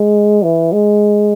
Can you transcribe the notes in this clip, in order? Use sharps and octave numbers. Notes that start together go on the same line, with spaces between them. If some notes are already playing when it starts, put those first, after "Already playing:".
Already playing: G#3
E3
G#3